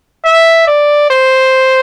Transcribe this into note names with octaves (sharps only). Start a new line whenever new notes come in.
E5
D5
C5